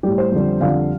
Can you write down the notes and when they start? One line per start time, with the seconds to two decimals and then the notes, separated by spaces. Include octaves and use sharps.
0.03 A2 G3 G4
0.18 C5
0.32 F2 D3 G3
0.61 F2 D3 G3 F5